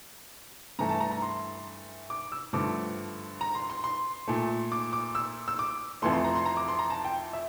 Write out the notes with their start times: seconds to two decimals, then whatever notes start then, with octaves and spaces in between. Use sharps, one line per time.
0.79 G2 E3 A3 A#5
0.89 A5
1.00 A#5
1.11 A#5
1.22 C6
2.10 D6
2.32 E6
2.53 G2 D3 F3 A3 D6
3.41 A#5
3.55 C6
3.70 C6
3.84 C6
4.28 A#2 A3
4.72 D6
4.93 D6
5.15 E6
5.48 E6
5.59 D6
6.02 F2 E3 A3 C6
6.13 C6
6.24 A#5
6.35 C6
6.46 A#5
6.57 D6
6.68 C6
6.79 A#5
6.90 A5
7.05 G5
7.33 E5